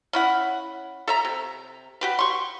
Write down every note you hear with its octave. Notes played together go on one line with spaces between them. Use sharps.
C#4 E4 F#5
A4 E5 A#5
C3
F#4 G4 B4
C6 C#6